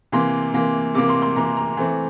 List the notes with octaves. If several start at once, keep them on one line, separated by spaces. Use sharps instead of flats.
C3 E3 A#3 C6
C3 E3 A#3
C3 E3 A#3 D6
C6
C6
C3 E3 A#3 A#5
A#5
E3 A3 C4